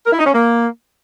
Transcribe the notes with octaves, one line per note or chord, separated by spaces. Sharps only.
A#4
E4
D#4
C#4
A#3